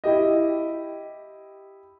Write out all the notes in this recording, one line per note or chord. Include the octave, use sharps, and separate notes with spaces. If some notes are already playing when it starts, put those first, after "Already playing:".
E4 G4 D#5